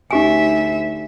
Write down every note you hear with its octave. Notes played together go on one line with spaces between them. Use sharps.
D2 D#4 G4 E5 G#5